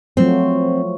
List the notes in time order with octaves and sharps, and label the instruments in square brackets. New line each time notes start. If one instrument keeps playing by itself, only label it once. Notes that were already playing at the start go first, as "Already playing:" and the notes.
[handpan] F3 F#3 A3 [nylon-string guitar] C4